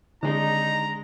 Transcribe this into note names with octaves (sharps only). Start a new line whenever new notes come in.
D3 D#3 G#3 D4 D#4 A#5